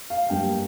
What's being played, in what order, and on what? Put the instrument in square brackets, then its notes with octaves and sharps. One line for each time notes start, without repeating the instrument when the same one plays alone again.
[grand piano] F5
G2 G3 A#3 G5